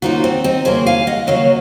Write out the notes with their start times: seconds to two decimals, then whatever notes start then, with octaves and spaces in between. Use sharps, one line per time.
0.02 C#3 F3 A#3 D#4 F#4
0.24 C4
0.44 C4 D#4
0.65 C#3 F#3 A#3 G#4 C5
0.86 F5 G#5
1.07 D#5 F#5
1.27 C#3 F#3 A#3 C#5 F5